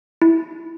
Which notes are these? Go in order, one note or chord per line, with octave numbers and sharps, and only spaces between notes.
E4